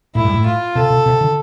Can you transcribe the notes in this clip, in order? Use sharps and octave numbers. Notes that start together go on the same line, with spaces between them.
A2 E4
G2
A2
F4
C3 A4
C3
C3
D3